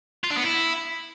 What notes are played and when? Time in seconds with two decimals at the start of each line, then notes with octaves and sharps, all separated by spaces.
0.24 F4
0.30 D4
0.37 B3
0.44 E4